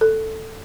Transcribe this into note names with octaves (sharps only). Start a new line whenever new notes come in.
A4